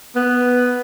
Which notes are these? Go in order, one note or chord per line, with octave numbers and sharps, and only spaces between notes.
B3